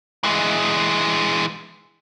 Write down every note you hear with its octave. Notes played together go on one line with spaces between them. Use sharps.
E3 G#3